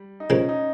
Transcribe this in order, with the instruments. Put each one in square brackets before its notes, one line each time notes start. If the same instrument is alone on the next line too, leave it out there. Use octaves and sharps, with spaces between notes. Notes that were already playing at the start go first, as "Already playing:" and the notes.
Already playing: [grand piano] G3
D#4
[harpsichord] C#3 F3 A#3 [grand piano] C#4
[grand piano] D#4